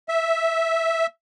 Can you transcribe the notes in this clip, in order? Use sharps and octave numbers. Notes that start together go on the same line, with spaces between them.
E5